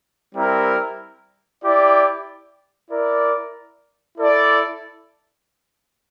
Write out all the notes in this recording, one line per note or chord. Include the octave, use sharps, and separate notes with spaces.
G3 C4 E4 A#4
E4 G4 D5
E4 A#4 D5
E4 A4 D5